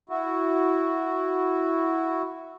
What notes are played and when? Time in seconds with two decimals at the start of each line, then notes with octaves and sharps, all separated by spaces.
0.09 E4 F#4